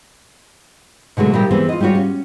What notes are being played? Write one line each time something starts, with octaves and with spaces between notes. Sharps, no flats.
B2 D3 F#3 G#3 A3
A#2 F3 G3 E4 G4 A#4
E3 G#3 B3 C4
F4 D#5
G3 G#3 F4 F#4 C#5
C#4